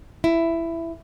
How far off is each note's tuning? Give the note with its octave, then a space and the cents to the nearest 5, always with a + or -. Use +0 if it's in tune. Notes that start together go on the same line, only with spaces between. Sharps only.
E4 +10